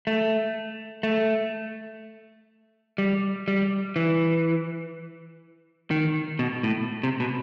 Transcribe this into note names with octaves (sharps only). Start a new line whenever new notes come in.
A3
A3
G3
G3
E3
D#3
B2
A2
C3
B2